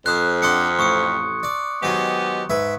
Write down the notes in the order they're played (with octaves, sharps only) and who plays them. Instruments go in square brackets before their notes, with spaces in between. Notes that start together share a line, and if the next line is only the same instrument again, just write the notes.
[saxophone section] F2 [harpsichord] C5 [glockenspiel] D#6 F#6
[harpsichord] D4 F#5 [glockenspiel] C6 D#6 C#7
[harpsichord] A1 [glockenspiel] C#6 D#6 C#7
[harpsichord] D5
[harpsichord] D#3 F#3 C5 [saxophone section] G#3 B3 G4
[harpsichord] G#2 B4 E5